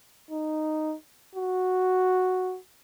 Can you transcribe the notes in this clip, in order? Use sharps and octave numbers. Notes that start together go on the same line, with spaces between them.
D#4
F#4